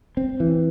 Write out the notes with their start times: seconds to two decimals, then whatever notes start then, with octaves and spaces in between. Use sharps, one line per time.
0.17 C4
0.40 E3